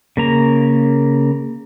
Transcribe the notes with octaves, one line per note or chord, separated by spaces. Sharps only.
C#3 A#3 A#5